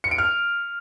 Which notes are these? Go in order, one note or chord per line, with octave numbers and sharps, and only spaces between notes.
C#7
D7
F6